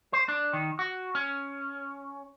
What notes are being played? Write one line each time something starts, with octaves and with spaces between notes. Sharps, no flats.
C5
D4
D#3
F#4
C#4